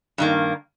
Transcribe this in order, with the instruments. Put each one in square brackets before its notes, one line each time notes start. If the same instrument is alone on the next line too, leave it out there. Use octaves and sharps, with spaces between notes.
[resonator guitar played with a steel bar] G2 D#3 A#3